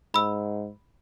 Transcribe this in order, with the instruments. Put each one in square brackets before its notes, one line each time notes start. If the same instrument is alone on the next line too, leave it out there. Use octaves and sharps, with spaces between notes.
[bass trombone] G#2 [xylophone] B5 E6